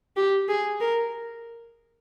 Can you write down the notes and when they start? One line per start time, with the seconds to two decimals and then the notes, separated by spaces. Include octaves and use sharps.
0.16 G4
0.48 G#4
0.81 A#4